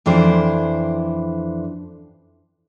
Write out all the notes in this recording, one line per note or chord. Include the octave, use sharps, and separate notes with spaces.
F2 E3 D4 C5